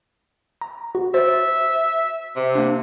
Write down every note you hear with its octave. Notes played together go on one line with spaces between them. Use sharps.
A#5
F#4
C5 E5 A6
C3
A#3 D4